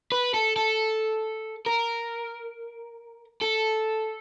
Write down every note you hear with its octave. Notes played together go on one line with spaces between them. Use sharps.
B4
A4
A4
A#4
A4